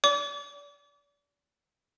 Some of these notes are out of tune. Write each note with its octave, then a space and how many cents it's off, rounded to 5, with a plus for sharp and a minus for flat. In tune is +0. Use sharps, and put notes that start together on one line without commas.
D5 -35 D6 -35